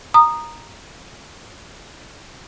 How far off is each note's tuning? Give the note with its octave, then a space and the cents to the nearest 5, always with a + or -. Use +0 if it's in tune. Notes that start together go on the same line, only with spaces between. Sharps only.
A#5 +0 D#6 -15